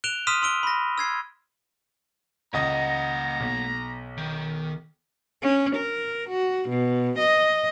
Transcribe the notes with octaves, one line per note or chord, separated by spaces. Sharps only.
F#6 D7 E7 F7 G7
C6 D#6 F6 B6 D#7 E7
C6 E6 D7 G7
B5 A#6
E6 G#6 C7
C#2 A#3 D#5 F#5 A#5 A#6
B1
D#3
C#4
A#4
F#4
B2
D#5